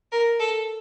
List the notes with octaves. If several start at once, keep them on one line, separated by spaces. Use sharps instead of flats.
A#4
A4